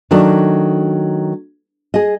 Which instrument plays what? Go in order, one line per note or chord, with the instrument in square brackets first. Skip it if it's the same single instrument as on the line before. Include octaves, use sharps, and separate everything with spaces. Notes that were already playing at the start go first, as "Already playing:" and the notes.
[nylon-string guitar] D#3 F#3 A3 D4 D#4
G#4 D#5